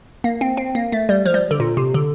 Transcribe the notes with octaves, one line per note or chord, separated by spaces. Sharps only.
A#3
C4
C4
A#3
A3
G3
F3
G3
D3
A#2
C3
D3